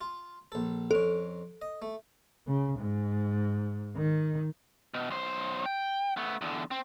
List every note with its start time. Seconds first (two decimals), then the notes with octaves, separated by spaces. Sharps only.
0.01 F4
0.52 A#1 A4
0.91 F2 C#4 A4
1.62 D#5
1.82 A3
2.47 C#3
2.78 G#2
3.97 D#3
4.94 B2
5.11 B1 C5
5.66 G5
6.17 A3 B3
6.41 E2 D3
6.71 C4